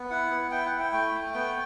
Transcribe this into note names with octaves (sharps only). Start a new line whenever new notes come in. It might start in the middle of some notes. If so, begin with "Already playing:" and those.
Already playing: B3
E4 F#5
B3
E4 G5
F#5
E4
G5
A3 G5
A3
B3 G5